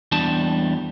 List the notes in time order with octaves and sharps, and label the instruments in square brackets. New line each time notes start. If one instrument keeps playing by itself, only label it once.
[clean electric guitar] E2 G3 D4 A5